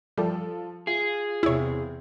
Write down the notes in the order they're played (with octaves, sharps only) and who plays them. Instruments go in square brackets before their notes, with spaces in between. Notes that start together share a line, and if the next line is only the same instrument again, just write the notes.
[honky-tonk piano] F3 A4 [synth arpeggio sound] G3
[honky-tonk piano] F4 [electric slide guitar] G#4
[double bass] E2 C3 [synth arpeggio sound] E4 C#5